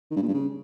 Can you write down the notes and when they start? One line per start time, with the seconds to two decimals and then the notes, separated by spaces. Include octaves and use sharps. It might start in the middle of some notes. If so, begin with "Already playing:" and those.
0.11 D#3
0.16 G2
0.22 A#2
0.28 G2
0.34 C#3